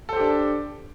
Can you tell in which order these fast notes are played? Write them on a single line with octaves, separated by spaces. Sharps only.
A4 C5 G4 D4